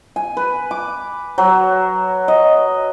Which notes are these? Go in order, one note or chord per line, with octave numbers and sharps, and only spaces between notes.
G#5
B4
D6
F#3
D#5